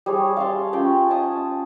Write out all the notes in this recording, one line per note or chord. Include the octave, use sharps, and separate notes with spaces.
G3 G#4 C#5
F5 A5 C6
C#4 F4 G5 C6
G#5 A5 D#6